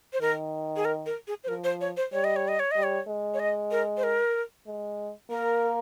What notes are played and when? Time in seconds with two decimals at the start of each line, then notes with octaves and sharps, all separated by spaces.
0.13 C5
0.21 D#3 A#4
0.76 G#4
0.85 A#4
1.06 A#4
1.27 G#4
1.44 C5
1.48 F3 A#4
1.64 C5
1.81 C#5
1.97 C5
2.12 G3 C#5
2.24 D#5
2.36 C#5
2.48 D#5
2.59 C#5
2.71 G3 D#5
2.83 C#5
3.08 G#3
3.34 C#5
3.39 D#5
3.71 A#4
3.97 C5
4.03 A#4
4.67 G#3
5.30 A#3 A#4